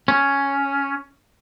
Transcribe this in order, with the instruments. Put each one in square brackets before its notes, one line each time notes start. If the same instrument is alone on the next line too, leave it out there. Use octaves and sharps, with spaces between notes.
[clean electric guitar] C#4